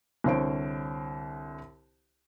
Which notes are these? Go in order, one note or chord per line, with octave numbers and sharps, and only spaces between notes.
C2 D3 C4 C5 C#5 D7